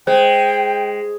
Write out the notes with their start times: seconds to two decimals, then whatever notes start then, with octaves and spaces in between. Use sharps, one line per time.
0.07 G#3 C5 G5